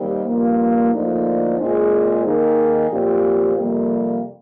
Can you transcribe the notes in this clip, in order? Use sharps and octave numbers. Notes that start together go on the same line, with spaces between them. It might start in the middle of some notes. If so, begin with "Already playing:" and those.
Already playing: D#2 D#3 G3 C4 G4
G2 F3 A#3
D2 D3 F3 A#3 D#4
A#2 G#3 C4 F4 G#4
D#3 A#3 D#4 G#4
A#2 F3 C4 G4
F2 C3 G3 A#3